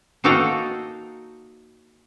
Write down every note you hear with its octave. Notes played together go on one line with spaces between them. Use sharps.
A#3 D#4 F#4 A4 F5 G5